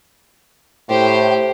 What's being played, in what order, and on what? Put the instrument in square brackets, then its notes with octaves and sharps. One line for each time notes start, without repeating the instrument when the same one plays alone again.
[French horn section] A2 [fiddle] G4 C5